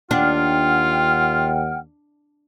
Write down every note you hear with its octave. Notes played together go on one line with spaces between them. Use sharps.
D#2 D4 F4 F#5 G5 F6